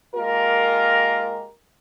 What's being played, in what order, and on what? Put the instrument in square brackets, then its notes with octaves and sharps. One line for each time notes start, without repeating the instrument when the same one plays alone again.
[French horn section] G#3 A#3 F4 G4 A#4